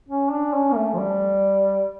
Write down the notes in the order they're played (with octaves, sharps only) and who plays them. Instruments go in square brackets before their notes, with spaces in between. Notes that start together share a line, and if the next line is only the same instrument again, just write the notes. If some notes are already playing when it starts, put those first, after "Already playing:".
[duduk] C#4
D4
C#4
A#3
A3
F3
G3